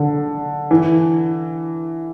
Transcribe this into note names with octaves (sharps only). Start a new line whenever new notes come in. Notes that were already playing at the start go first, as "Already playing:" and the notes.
Already playing: D3
E3